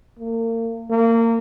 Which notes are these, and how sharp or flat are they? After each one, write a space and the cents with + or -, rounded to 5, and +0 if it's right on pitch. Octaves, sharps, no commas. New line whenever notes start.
A#3 -35
A#3 -25